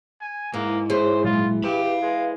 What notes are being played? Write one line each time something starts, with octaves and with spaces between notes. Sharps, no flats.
G#5
G#2 E3 A#3
E3 G#4 C5 C#5
A#2 F#3 G#3 F4
G4 B4 F5 B5
G#3